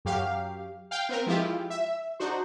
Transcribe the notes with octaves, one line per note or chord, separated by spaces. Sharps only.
F#2 F#3 G4 F5
F5 G5
B3 C4 A#4
F3 G#3 E4 F4 G4
E5
D4 D#4 F#4 C5